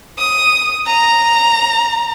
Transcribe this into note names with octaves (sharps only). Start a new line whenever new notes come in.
D#6
A#5